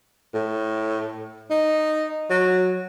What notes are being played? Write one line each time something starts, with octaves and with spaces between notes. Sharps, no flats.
A2
D#4
F#3